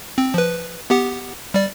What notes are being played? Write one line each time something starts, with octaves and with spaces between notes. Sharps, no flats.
C4
F3 B4
B3 G4 F#5
G3 D5